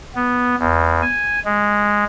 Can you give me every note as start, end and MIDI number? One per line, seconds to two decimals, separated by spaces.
0.15 0.55 59
0.59 1.01 40
1.02 1.39 80
1.45 2.04 56